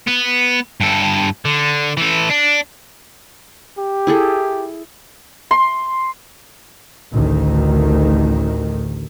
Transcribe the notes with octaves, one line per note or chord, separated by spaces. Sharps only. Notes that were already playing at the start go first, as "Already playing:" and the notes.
B3
G2 A4
D3
E3 A4
D4
G4
E4 G#4 A4
C6
A1 D2 D#3